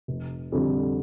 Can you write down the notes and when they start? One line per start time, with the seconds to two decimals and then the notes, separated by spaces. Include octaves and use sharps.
0.08 F1
0.52 F2 D3 G3